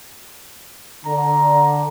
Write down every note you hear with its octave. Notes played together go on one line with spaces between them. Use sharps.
D3 A#5